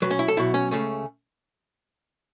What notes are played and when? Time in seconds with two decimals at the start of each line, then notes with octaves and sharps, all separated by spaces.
0.02 B1 B2 F#3 B4
0.11 C#4
0.19 E4
0.28 A4
0.37 B1 B2 F#3 E4
0.54 C#4
0.71 C#2 C#3 A3 C#4